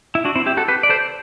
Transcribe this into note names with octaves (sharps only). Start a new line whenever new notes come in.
E4
D4 F#4
C4 E4
E4 G4
F#4 A4
G4 B4
D5
A4 C5